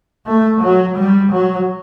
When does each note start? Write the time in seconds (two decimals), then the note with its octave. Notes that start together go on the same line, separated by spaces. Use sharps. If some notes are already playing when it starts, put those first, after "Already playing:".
0.26 A3
0.61 F#3
0.97 G3
1.32 F#3